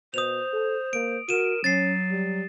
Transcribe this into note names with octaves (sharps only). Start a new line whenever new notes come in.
B2 C5 D#6 F7
A4
A#3 D7
F#4 A#4 D#7 E7
F#3 C#4 A6 C7
G3